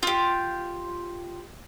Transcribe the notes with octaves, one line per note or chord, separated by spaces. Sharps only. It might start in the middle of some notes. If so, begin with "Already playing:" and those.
F4 G4